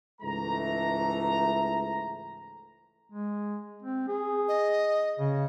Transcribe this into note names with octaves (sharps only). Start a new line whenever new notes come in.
C#2 G#2 E3 A3 A#5
G#3
C4
G#4
D#5
C#3